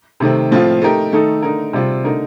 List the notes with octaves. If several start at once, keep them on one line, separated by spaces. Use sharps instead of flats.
C3 D#3 A3 C4
A2 F3 C4 F4
A3 D#4 G4 A#4
D#3 A3 D#4 A4
D3 A3 D#4 A#4
C3 G3 C4 F4
D3 A3 D#4 A#4